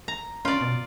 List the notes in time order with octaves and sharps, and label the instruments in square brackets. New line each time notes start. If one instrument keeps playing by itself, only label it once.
[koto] A#5
[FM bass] C#4 [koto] F4 D5
[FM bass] B2